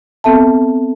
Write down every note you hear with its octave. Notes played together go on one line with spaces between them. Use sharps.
B3 C4 A4 E5 A5